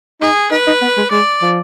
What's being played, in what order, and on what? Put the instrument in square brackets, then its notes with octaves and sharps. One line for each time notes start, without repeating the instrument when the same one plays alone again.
[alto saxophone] D#4 [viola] G#4
[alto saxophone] D#4 [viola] B4
[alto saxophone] D#4
B3
G#3
[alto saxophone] G#3 [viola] D5
[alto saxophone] F3